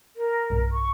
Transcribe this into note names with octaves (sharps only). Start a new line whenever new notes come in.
A#4
B1 G2
C#6